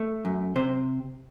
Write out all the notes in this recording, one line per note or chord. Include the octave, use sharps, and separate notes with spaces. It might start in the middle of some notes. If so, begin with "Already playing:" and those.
Already playing: A3
F#2
C3 C5